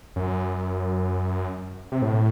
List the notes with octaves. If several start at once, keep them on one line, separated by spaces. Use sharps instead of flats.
F#2
C3
A2